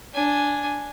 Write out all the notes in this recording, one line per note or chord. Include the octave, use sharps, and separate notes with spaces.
D4 G#5